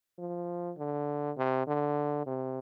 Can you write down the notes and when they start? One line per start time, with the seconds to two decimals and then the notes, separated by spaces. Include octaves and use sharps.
0.18 F3
0.77 D3
1.37 C3
1.67 D3
2.27 C3